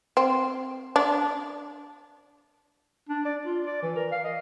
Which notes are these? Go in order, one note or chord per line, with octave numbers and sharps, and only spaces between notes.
C4
D4
D4
D5
F4
D5
E3
A#4
F5
D#5